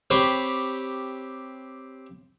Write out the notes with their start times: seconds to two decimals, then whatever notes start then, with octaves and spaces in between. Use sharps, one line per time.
0.10 C4 G4 B4 C#5